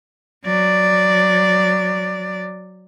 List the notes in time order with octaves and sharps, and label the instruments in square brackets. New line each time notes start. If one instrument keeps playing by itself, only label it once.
[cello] F#3 D5